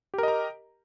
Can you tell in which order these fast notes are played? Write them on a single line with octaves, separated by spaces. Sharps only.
G4 A#4 D#5 A#5